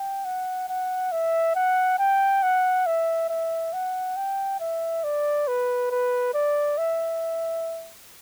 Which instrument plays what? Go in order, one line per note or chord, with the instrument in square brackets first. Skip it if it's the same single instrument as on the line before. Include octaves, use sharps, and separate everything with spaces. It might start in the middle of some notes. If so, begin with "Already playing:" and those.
Already playing: [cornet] G5
F#5
F#5
E5
F#5
G5
F#5
E5
E5
F#5
G5
E5
D5
B4
B4
D5
E5